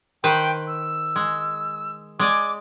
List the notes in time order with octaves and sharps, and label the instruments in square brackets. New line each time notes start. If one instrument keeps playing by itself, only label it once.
[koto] D#3 B4 C5 [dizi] G5
[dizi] E6
[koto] G#3
[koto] G#3 D5 G#5 [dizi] D6